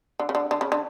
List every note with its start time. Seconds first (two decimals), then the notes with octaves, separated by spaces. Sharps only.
0.19 D3
0.29 C#3
0.35 D3
0.51 D3
0.61 C#3
0.72 D3